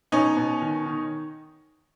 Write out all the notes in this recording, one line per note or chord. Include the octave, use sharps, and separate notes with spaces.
B2 C#4 D#4
B2
D#3
D#3